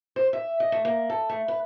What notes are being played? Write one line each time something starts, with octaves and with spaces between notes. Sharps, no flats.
C5
E5
D#5
A3
A#3
A4
A3
B4